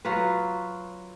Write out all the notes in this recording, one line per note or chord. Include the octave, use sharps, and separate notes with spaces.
F#3 F4 B4